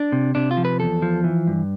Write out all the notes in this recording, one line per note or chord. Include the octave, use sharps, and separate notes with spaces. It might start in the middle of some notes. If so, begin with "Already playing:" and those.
Already playing: D4
C3
C3 D4
F4
F3
B4
E2 A4
F3
E3
G2